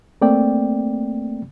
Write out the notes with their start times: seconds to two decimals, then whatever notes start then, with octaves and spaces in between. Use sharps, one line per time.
0.21 A3 A#3 C4 D5 G5